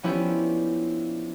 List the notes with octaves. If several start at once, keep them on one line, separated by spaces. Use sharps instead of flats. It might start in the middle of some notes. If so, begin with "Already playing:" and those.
F3 B3 C#4 D4 E4 G4